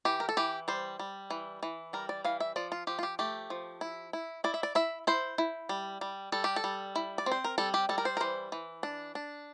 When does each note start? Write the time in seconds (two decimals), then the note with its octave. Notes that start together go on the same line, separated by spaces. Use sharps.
0.05 E3 G4
0.20 A#4
0.29 A4
0.37 E3 G4
0.68 G3 C5
0.99 G3
1.30 E3
1.63 E3
1.93 G3 A#4
2.09 D5
2.25 E3 F5
2.40 E5
2.56 F3 D5
2.72 F4
2.87 F3 G4
2.99 F4
3.03 G4
3.19 A3 G4
3.50 F3
3.81 E4
4.13 E4
4.44 E4 D5
4.54 E5
4.63 D5
4.75 E4 E5
5.07 E4 C5
5.38 E4
5.69 G3
6.01 G3
6.32 G3 A4
6.44 G4
6.56 A4
6.64 G3
6.96 E4
7.18 D5
7.26 C4
7.32 C5
7.44 A#4
7.58 G3 A4
7.74 G4
7.89 G3 A4
7.98 A#4
8.05 C5
8.17 A#4
8.21 E3 C5
8.52 E3
8.83 D4
9.15 D4